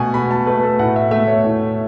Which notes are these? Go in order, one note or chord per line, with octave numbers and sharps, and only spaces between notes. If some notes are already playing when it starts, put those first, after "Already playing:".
Already playing: B2 A3 F#5 G#5
B2 B5
A5
A3 B4
A4
A2 F#5
E5
A3 E5
C#5
A2